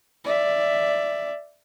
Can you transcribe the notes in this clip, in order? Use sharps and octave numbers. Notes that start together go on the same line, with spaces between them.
D5 E5